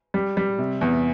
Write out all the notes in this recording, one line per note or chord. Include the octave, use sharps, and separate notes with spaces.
G3
G3
C3
E2